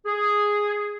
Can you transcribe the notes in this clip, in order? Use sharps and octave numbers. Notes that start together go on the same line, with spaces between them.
G#4